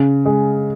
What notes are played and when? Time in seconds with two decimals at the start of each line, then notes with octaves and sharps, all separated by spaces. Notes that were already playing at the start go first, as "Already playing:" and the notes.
Already playing: C#3
0.26 G#3